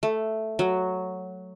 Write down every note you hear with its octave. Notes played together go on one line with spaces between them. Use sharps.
A3
F#3